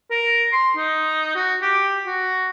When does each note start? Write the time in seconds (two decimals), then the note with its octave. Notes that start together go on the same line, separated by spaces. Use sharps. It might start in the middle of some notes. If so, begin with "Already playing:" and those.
0.11 A#4
0.52 C6
0.77 D#4
1.35 F#4
1.62 G4
2.06 F#4